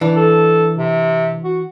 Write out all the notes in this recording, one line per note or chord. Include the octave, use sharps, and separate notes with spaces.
E3 D4
A4
C3
F#4